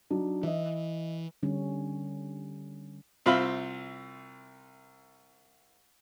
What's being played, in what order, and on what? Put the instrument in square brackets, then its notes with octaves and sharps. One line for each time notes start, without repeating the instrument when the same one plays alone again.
[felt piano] F#3 D4 D#4
[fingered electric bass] E3 [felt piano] D#5 E5
[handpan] D3 G3 C#4
[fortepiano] C2 C4 F4 E5 F5 B5